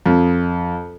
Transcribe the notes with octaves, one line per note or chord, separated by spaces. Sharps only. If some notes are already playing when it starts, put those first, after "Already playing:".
F2